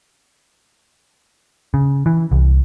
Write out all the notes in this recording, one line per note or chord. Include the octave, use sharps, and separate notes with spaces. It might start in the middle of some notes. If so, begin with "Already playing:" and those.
C#3
E3
C2